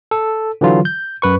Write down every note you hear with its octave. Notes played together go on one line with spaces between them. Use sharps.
A4
D3 E3 F#3 F4
G6
F#2 B4 C#6